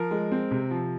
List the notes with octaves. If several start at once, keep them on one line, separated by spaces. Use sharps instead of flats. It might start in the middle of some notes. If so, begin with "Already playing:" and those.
Already playing: F3 A#4
G#3
C4
C3
F3